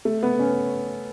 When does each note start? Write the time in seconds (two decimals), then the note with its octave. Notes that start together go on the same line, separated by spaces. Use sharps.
0.05 A3
0.23 B3
0.39 C#4